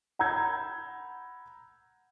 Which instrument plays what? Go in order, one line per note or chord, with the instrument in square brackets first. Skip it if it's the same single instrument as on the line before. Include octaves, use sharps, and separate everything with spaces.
[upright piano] F#5 A#5 B5 E6 G6 G#6